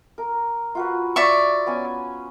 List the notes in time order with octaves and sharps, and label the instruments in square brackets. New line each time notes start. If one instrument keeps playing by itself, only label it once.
[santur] A#4
F4 F#4 B4
[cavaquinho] D5 E5 C#6
[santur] B3 C#4 G#5